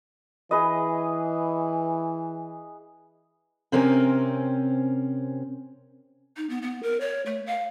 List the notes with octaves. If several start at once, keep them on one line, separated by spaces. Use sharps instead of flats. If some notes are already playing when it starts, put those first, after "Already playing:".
E3 G#4 B4 D#5
C3 C4 C#4 A#4 G#5
D#4
B3
B3
A#4
C#5
A3
F5